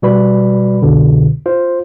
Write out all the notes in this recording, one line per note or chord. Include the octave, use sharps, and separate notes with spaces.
B2 G3 F#4 B4 D5 B5
C2 F2 B2 D3
F4 C5